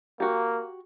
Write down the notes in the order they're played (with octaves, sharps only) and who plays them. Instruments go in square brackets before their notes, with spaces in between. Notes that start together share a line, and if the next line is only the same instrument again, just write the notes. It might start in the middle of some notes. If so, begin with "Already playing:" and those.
[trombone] A#3 [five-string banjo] F#4 G4